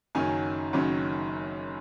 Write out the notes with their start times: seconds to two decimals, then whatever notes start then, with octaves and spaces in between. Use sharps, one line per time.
0.15 F#1 F#2 D#3 F#3 C#4 G#5
0.73 F#1 F#2 D#3 F#3 C#4